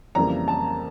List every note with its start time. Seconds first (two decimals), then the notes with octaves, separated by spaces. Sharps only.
0.15 F2 C#3 E3 G3 A#3 A#5
0.48 A5